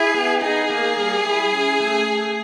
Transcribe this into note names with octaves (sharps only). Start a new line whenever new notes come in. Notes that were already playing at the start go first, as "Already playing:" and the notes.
Already playing: E4 G#4
B3
D#4 G#4
A#3
G3
E4
C#4
A3